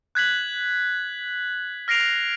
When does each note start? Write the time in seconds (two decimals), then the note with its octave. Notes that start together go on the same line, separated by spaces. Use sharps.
0.15 F#6 G#6 B6 F#7
1.88 F6 A#6 C7 D7 F7